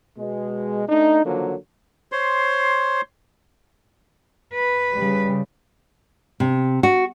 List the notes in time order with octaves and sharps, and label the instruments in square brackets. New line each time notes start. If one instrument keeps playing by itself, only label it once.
[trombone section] B2 G#3
A3 D4 D#4
D3 D#3 F3 F#3 A#3
[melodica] C5 C#5 C6
[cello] B4
[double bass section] C#3 G3
[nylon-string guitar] C3
F#4